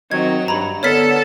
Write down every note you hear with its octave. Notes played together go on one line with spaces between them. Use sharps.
D#3 F#3 C4 D#5 G#6
G2 A#5 B5
D3 B3 A4 C#5 A5 F6 B6